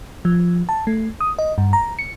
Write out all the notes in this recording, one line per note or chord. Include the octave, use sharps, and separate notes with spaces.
F3
A5
A3
D#6
D#5
G2
A#5
C#7